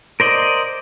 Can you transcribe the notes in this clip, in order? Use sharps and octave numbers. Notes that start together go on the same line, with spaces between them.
A#4 C5 D5 D#5